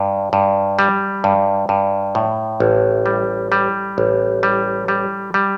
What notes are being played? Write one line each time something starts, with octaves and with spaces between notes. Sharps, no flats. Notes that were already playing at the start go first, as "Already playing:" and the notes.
Already playing: G2
G2
G3
G2
G2
A2
A1
G3
G3
A1
G3
G3
G3